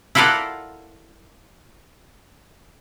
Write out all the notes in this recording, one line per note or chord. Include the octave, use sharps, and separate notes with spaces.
E4 F4 A4 A#4 D5 F#5